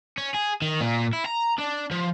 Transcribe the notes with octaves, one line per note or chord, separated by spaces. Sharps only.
C#4
G#4
D#3
A#2
E4
A#5
D4
F3